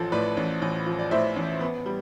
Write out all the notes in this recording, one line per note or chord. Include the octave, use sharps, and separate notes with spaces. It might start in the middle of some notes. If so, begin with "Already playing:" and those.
Already playing: A1 F3 A4 C5
A2 B4 D5
A1
A1
F3
D5
A2 C5 E5
A1
B3
G3